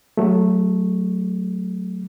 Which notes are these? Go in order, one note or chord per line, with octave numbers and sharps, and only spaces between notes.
F#3 A3